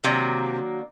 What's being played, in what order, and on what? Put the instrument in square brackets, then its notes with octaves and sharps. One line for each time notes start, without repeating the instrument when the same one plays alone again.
[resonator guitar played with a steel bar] C3 [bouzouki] D#3 F#3 A#3 D4